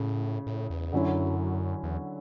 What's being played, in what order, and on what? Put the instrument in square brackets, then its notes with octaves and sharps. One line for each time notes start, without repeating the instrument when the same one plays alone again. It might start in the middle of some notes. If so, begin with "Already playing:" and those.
Already playing: [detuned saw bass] A2 [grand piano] C#3
[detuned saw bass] A2
E2
[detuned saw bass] F#2 [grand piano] D3 F#3 C#4 E4
[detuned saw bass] E2